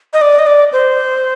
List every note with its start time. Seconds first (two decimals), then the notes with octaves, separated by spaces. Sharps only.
0.13 D#5
0.21 D5
0.39 D#5
0.46 D5
0.73 C5